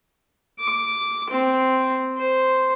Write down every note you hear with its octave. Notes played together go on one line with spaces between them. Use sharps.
D6
C4
C5